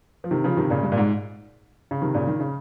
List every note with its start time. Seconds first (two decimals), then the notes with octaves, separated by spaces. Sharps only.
0.24 F3
0.31 C3 D#3
0.44 C#3 F3
0.57 C3 D#3
0.70 A#2 C#3
0.83 G2
0.92 A#2
0.97 G#2
1.91 C#3
2.01 C3 D#3
2.14 A#2 C#3
2.27 D#3
2.40 C#3